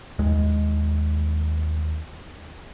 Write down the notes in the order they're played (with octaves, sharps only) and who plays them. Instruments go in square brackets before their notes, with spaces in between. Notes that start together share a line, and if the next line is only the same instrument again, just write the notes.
[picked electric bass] D#2 G#3